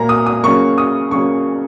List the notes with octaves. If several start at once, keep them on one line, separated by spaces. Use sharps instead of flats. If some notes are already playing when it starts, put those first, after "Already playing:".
Already playing: A#2 A#3 A#5
D#6
D#6
C#3 F#3 A#3 C#6
D#6
C#3 F#3 A#3 C#6